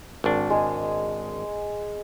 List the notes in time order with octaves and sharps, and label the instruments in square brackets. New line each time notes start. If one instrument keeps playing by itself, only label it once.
[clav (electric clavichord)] G#1 D4
[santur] G#3 G#4